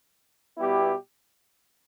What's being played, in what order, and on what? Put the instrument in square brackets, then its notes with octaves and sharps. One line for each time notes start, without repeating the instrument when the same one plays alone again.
[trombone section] B2 G3 B3 E4 G4